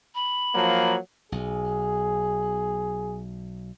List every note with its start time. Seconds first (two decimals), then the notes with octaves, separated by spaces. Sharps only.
0.15 B5
0.54 F3 F#3 A#3
1.32 B1 G#4